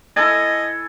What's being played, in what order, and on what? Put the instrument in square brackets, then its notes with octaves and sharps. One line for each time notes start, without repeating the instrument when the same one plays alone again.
[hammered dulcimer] E4 A4 G#5 [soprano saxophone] D#5